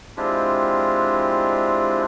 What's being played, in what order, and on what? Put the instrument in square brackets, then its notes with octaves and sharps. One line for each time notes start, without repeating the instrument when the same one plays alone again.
[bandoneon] G#3 C4 D4 E4 F4 G4